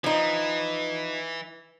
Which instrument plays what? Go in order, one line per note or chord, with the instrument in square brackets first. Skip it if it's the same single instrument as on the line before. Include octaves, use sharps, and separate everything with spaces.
[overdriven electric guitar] E3 [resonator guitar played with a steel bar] F3 D#4